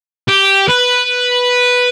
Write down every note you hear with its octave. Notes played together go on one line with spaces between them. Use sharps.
G4
B4